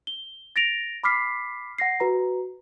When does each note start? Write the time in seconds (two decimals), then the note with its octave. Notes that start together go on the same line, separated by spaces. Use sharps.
0.07 G7
0.56 A6 A#6 D7 F7
1.04 B5 D6 F6 B6 C7
1.78 F#5 A#6 C7
2.00 F#4 B4 A#5